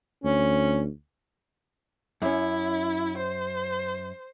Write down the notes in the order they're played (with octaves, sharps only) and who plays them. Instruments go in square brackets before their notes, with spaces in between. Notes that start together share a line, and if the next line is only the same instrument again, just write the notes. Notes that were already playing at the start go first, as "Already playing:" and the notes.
[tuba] D2 [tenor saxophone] C#4
[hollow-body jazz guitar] F#2 C#4 [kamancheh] E4
[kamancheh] C5